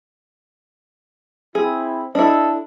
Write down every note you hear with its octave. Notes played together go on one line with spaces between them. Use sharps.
C4 E4 G#4
D4 E4 A4 D#5